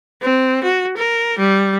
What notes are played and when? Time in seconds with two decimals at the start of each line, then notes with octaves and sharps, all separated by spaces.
0.22 C4
0.64 F#4
0.97 A#4
1.39 G3